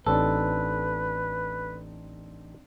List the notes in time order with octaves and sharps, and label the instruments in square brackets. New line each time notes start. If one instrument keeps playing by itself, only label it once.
[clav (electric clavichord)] A1 [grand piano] C4 D4 D#4 [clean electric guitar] A4 [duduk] B4